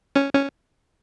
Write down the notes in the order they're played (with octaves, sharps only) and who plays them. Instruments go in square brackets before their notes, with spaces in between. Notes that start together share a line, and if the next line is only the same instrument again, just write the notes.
[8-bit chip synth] C#4
C#4